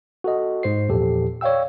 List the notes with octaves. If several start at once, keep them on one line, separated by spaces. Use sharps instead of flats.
F#4 A4 D#5
G#2 C5 C7
E2 A#2 F3 G4 A4
C#5 D5 F5 G5 E6